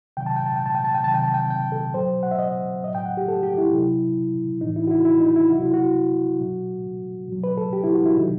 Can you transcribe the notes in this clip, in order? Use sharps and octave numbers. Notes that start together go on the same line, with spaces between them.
C3 D#3 F#3 G5
A5
G5
A5
G5
A5
G5
A5
G5
C3 D#3 F#3 A5
G5
A5
G5
G5
A4
B2 F#3 C5
F#5
E5
D#5
F#3 D#5
A2
G5
F#5
G4
A4
G4
E4
C3 F#3
A2 E3 D#4
E4
F#4
E4
E4
D#4
E4
C3 F#3 F#4
E4
F#4
B2 F#3
B2 F#3
B4
A4
G4
E4
F#4
E4
C3 D#3 F#3 D#4